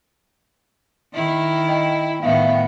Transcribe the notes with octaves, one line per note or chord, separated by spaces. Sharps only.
D#3 E4
D#5 G5
A2 D#3 B3 E5 F5